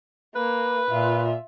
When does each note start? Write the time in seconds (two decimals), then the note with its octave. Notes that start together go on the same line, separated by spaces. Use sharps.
0.36 A#3 B4
0.90 A#2 F4 E5